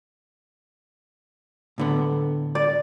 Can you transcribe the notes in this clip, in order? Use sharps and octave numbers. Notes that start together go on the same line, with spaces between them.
A2 D3 B3
D5